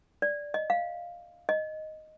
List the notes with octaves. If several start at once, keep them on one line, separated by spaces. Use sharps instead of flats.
D5
D#5
F5
D#5